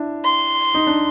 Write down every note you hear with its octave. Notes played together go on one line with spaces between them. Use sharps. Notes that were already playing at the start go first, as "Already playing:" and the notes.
Already playing: D4 E4
C6
D#4
D4